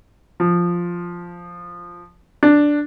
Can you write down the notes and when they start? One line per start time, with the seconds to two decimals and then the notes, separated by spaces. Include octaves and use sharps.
0.40 F3
2.43 D4